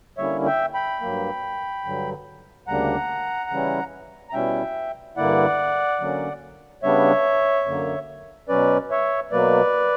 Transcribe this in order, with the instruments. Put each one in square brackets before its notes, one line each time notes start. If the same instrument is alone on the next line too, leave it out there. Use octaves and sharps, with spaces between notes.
[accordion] D3 G3 A#3 C#4 E4 C#5 E5
E5 G5
G5 B5
G2 F#3 A#3
G2 D3 F#3
D2 C#3 G3 A#3 D4 F#5 A#5
C#3 E3 G3 C#4 E4
A#5
B2 G3 C#4 E4 E5 G5
G2 D3 A#3 E4 D5 F#5
D3 F#3 A#3 C#4
C#3 G3 B3 D4 C#5 E5
F#2 D3 A#3
B2 F#3 C#4 B4 D5
C#5 E5
B2 F#3 A#3 B4 D5